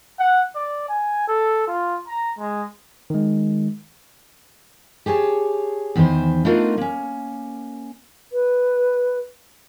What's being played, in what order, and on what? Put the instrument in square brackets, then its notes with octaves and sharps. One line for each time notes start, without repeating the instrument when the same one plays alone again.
[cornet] F#5
D5
G#5
A4
F4
A#5
G#3
[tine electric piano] D#3 G#3
[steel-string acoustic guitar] G4 G#4 C#5 A5
E2 D#3 E3 B4 C5
A3 B3 D4 D#4 F4 A#4
A#3 C#4
[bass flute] B4